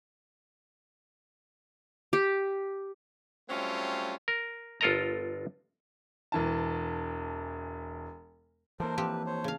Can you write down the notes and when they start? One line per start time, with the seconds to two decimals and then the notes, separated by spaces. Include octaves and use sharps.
2.13 G4
3.49 F#3 G3 A3 C4 C#4 F4
4.28 A#4
4.81 G1 F4 A4 A#4 D#5 A#5
6.32 E1 E3 A5
8.80 E3 A#3 A4 A#4 C5
8.98 F3 C4 G4 B4
9.26 C5 C#5
9.44 C#3 F5